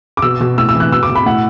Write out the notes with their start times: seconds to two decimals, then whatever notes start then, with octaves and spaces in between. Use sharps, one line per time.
0.17 D6
0.22 B2 E6
0.41 B2
0.58 A2 E6
0.69 E6
0.75 E3
0.80 F#6
0.92 B2 E6
1.03 D6
1.10 B2
1.15 B5
1.26 A2 F#5